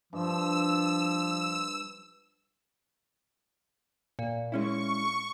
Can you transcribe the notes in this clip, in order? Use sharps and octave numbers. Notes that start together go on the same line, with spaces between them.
G2 F3 E6
A#2
G#3 C#4 E4 C#6